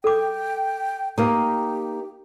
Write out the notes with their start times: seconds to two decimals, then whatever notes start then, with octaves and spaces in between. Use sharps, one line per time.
0.04 A4 G5 D6
1.18 A#3 D#4 G4